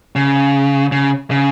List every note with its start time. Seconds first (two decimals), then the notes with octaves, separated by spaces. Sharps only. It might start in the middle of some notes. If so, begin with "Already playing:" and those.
0.16 C#3
0.92 C#3
1.31 C#3